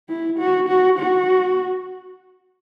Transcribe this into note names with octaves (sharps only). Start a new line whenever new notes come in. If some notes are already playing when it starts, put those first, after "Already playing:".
E4
F#4
F#4
F#4